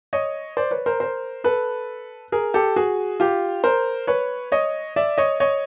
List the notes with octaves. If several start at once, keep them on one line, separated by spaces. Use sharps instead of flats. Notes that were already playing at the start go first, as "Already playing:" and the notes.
C#5 D#5
C5 D5
B4 C#5
A#4 C5
A#4 C5
A4 B4
G#4 A#4
G4 A4
F#4 G#4
F4 G4
A#4 C5
B4 C#5
C#5 D#5
D5 E5
C#5 D#5
C#5 D#5